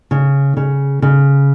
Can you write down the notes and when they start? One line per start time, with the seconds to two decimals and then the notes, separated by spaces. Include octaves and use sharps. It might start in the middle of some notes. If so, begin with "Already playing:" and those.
0.11 C#3
0.57 C#3
1.02 C#3